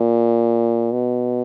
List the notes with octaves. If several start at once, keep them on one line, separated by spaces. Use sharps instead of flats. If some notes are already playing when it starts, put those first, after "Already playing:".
Already playing: A#2
B2